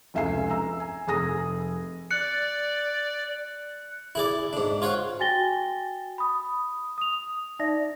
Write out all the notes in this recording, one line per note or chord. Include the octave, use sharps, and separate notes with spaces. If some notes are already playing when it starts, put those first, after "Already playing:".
F1 C#2 E5 G#5 C7
A#5 E6
G#5
F1 G#4 G#5 D#6 A#6
D5 F#6 C#7
E4 G#4 D5
G#2 D4
F4 C#5 F5 F#5
F#4 G5 G#5 A6 A#6 G7
B5 D#6
D#6 F7
D#4 D5 E5 A#6